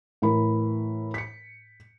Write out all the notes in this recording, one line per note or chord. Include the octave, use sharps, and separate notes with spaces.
A2 E3 A#4 B5
B6 C#7